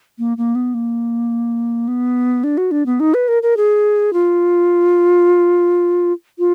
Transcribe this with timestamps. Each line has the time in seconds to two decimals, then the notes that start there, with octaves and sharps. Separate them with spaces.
0.19 A#3
0.37 A#3
0.55 B3
0.74 A#3
1.88 B3
2.44 D4
2.57 F#4
2.71 D4
2.86 B3
3.00 D#4
3.14 B4
3.28 A#4
3.43 A#4
3.57 G#4
4.13 F4
6.39 F4